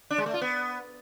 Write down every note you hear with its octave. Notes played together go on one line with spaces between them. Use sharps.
D4
G#3
A3
F4
B3